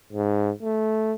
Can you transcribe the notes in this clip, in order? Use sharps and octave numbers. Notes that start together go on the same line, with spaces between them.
G#2
A3